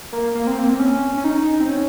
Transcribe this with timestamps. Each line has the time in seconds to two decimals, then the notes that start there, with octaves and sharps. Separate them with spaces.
0.12 A#3
0.35 A#3
0.47 C4
0.59 A#3
0.69 C4
0.79 C#4
1.17 C#4
1.24 D#4
1.60 C4
1.69 C#4